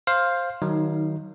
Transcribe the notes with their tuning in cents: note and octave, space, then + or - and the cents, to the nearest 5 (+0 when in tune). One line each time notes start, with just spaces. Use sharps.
C5 +10 F5 +0
D#3 +0 F#3 +25 D#4 +25